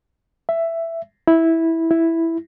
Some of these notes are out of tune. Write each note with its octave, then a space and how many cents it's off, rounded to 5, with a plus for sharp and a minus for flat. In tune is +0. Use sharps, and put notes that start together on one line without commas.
E5 +10
E4 -10
E4 +0